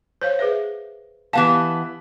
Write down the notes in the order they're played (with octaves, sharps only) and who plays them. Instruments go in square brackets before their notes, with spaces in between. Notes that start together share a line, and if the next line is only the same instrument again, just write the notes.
[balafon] C5 C#5 F5
G#4 B4 E5
[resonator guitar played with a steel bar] E3 B3 A5 [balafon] G4 F5